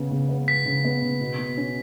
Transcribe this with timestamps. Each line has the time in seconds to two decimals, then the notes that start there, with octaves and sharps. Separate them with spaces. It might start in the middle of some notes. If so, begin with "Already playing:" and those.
Already playing: C#3 B3
0.11 C#3
0.29 B3
0.48 C#3 B6
0.66 C#3
0.85 B3
1.02 C#3
1.21 B2
1.39 B2
1.57 C#4